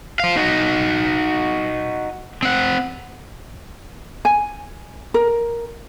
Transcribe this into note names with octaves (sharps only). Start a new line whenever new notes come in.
C5 F5
D#4 F#4
C4 F#5
G#5
A#4